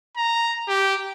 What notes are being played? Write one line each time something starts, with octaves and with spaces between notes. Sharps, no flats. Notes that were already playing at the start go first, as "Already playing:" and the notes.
A#5
G4